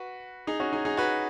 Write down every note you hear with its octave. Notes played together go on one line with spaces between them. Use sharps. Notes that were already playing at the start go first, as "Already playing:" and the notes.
Already playing: F#4 B4
D#4 G#4
C#4 F#4
D#4 G#4
D#4 G#4
F#4 B4